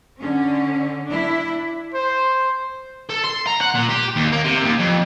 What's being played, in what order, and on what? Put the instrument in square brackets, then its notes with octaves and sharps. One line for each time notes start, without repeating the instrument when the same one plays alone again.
[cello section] D3 C#4
D4 E4
[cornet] C5
[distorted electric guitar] A4
C6
A#5
F#5
A#2
G4
D#2
A#3
C3
D#2
F2